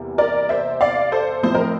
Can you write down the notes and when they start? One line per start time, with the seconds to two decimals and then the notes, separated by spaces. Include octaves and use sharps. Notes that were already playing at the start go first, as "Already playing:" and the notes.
Already playing: E2 C3 G3 A#3
0.18 A#4 D5
0.49 C5 E5
0.81 D5 F5
1.12 A4 C5
1.43 A2 F3 C4 C5
1.55 A#4